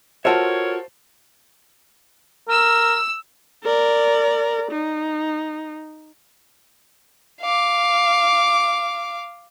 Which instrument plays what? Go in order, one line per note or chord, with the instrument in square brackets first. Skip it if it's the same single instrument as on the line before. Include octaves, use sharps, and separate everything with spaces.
[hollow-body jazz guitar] F4 F#4 E5 [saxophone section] A4 A#4 C#5 [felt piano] C5 A5
[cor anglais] A#4 [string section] E6
[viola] A#4 D5
D#4
[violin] F5 D6